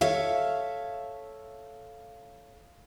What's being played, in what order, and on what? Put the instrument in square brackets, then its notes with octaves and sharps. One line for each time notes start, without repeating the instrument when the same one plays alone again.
[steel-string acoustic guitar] A4 C#5 E5 F5